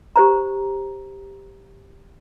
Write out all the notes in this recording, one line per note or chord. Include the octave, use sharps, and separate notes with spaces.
G4 C5 A#5